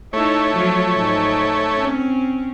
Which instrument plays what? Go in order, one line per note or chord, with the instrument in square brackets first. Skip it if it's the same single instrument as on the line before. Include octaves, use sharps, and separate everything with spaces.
[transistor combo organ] A3 C#5 [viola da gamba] D#4 E4
[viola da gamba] F3 F#3 F4
G#2
C4 C#4